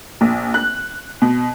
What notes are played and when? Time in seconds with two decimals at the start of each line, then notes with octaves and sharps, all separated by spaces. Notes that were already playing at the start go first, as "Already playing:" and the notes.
0.21 A#1
0.54 F#6
1.22 B2